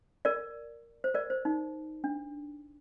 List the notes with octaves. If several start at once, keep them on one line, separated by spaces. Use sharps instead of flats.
A#4 D5
C5
A#4 D5
C5
D#4
D4